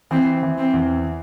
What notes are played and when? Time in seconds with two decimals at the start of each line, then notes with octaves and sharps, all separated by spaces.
0.11 E3 C4
0.43 E3
0.58 C4
0.73 E2